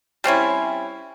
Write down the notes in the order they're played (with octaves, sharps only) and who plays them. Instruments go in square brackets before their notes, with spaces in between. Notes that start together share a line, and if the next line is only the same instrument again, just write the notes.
[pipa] G3 C4 C#4 E4